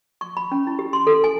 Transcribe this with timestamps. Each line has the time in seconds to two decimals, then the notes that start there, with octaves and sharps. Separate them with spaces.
0.21 C#6
0.37 B5
0.52 C#4
0.67 E4
0.79 G4
0.93 C6
1.07 A4
1.24 G#5